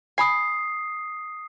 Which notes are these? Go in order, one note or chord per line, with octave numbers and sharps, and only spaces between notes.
G#5 B5 D#6 C7